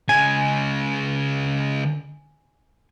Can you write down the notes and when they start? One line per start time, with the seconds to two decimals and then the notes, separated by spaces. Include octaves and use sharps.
0.09 C#3 G#3 G#5